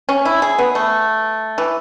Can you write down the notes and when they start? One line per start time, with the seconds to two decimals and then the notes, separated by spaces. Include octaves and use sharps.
0.09 C#4
0.25 E4
0.42 G#4
0.58 B3
0.75 A3
1.58 E3